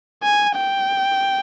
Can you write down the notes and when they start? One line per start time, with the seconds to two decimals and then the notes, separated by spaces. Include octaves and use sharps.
0.23 G#5
0.56 G5